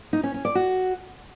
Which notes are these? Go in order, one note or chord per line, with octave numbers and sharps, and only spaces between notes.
D#4
C#4
C#4
D5
F#4